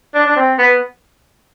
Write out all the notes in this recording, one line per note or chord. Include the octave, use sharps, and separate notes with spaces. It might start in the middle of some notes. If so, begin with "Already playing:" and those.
D4
D4
C4
B3